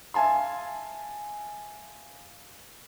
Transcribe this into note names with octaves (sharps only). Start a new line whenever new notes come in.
E5 F5 G#5 A5 C6